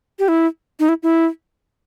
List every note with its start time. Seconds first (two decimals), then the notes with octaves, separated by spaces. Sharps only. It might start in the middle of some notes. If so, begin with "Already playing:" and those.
0.19 G4
0.28 E4
0.80 D#4
0.89 E4
1.03 E4